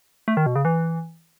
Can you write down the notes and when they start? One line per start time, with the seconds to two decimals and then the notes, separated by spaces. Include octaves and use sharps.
0.28 A3
0.37 D#3
0.46 B2
0.56 C#3
0.65 E3